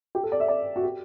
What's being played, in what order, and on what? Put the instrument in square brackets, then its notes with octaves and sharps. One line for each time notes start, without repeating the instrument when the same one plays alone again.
[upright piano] G4
A4
D5
E5
D5
F#4
G4